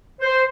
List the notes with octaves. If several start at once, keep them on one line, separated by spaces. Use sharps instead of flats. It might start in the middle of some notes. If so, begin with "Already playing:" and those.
C5